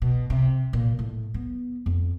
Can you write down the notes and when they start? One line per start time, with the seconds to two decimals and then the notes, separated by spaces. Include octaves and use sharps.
0.02 B2
0.30 C3
0.73 A#2
0.99 A2
1.34 B3
1.86 F2